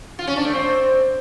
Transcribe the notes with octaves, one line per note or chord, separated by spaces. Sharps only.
F4
C#4
D4
A3
C4